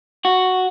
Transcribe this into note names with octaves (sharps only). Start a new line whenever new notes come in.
F#4